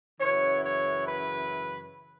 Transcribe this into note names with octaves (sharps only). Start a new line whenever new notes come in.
F#2 C#3 E3 C#5
C#5
B4